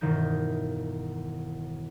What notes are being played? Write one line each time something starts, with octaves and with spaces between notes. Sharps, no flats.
E1 G2 D#3 D#4 G6